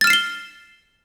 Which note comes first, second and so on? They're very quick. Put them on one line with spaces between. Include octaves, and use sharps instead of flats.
A6 F6 E7 C7 G7